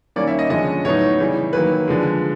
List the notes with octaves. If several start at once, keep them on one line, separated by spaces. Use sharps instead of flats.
D#3 G3 A#3 C#4 D5
E5
D#5
D3 F3 G#3 C#4 D#5
A2 F#3 B3 D#4 C#5
C#3 E3 G3
D#3 F#3 A#3 B4
D3 F3 G#3